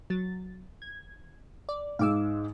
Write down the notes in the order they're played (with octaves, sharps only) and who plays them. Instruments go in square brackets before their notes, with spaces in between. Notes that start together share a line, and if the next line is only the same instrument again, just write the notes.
[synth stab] F#3 A6
G#6
D5
[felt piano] G#2 G#3 [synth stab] F5 D6 E6